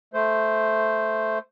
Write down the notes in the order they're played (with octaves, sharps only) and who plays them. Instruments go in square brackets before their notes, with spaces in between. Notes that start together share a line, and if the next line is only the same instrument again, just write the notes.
[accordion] A3 C5